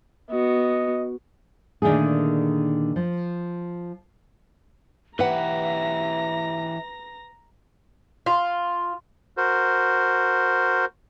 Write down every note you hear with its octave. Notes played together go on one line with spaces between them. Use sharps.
B3 F#4 D#5
A#2 D3 D#3 G#3 A3 G#4
F3
E3 G4 B4 E5 F#5 A#5 A#6
F4
F#4 A#4 C5